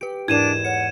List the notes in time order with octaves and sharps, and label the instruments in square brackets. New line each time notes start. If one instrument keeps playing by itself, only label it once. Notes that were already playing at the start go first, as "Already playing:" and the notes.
[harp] G4 [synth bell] B4 D7
[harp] E2 G#2 [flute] D4 [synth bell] E4 A#4 [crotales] G#6 D#7 E7
[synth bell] C#5 C#7 [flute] F#5